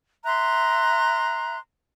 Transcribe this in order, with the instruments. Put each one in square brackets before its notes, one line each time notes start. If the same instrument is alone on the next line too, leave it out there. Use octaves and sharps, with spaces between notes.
[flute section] E5 A#5 C6 F#6